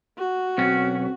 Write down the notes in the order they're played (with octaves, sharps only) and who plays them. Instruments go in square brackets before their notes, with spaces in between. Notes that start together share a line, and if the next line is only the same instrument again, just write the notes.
[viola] F#4
[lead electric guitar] B1 C#4 [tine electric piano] C4